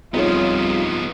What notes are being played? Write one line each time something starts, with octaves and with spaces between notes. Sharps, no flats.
C2 F3 B3 D#4 F4 G#4 C#5